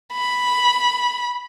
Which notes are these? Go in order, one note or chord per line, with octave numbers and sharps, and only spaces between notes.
B5